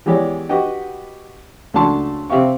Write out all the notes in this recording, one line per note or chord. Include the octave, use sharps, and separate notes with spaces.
E3 G#3 B3 G4 C#5 D5
F#4 G4 B4 D#5 F#5 G5
C#2 A3 D4 F#4 A5 C6
C3 C4 G4 E5 F5 C#6